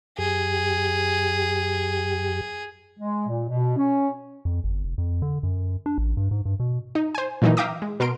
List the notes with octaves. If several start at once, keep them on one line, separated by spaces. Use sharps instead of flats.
F#2 G4 G#4
G#3
A#2
B2
C#4
F2
G1
F1
F2
D3
F#2
D4
A1
G2
G#2
G2
B2
D#4
C5 G#5
A#2 D#3 E3 F#3 D#4
E5 F5 G5 A#5 D6 D#6
G#3
B2 A#4 C6 D7